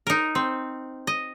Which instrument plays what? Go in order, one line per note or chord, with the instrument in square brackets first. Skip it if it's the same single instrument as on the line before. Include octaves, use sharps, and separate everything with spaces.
[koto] D#4 A#4
C4
D#5